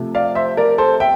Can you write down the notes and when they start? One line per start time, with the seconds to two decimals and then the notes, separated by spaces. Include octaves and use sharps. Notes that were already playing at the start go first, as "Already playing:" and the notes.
Already playing: C3 F3 A3
0.15 D5 F5
0.35 C5 E5
0.57 A#4 D5
0.78 A4 C5
1.00 E5 G5